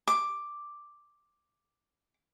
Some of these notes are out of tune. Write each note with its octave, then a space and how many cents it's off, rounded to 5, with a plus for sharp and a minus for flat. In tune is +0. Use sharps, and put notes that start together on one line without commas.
D6 +5